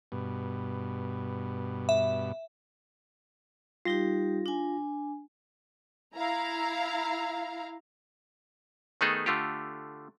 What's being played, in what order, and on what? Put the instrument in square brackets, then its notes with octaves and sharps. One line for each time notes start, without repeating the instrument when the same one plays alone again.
[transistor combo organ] G2 B2
[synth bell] E5
[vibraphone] G3 D#4 G4 [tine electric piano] F4 A#6
[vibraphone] D4 G#5
[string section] E4 F5 A#5
[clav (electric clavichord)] D#3 A3 B3 D#4 G#4 A4
D3 A3 F4 G4